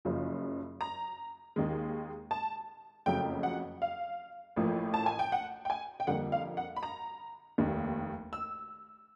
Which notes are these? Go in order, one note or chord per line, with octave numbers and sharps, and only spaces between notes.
F#1 F#2 C#3 F3
A#5
D#2 D#3 G#3
A5
F#1 F2 C#3 F#3 A3 G5
F#5
F5
A1 A2 F3 A#3
A5
G#5
G5
F#5
G5
G#5
G5
F2 D3 G3 A#3 F#5
F5
F#5
B5
A#5
F1 D#2 D#3
E6